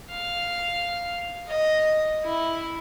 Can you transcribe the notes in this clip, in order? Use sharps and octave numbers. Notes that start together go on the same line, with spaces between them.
F5
D#5
E4